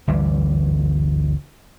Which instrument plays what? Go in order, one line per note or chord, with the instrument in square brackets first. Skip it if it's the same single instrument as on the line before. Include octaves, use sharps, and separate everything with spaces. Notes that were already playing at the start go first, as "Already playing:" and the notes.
[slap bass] G1 D2 E3 G3